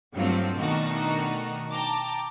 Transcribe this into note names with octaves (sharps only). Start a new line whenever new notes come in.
G2 F3 F#3 A3 C4 F4
B2 D#3 A3 D4 D#4 F#4
G5 A5 A#5 D6